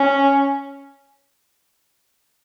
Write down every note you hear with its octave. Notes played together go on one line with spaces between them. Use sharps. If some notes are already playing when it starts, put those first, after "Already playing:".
Already playing: C#4